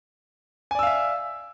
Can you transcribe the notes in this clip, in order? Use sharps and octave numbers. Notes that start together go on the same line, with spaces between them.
D5 E5 F5 G#5 E6